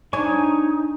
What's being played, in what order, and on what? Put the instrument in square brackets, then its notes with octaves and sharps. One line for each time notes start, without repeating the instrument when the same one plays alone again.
[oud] D4 [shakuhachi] D#4 [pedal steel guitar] C#5 G#5 C#6